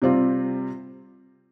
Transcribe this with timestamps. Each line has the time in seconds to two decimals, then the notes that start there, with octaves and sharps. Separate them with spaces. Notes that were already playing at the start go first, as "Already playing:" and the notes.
0.02 C3 G3 C4 F4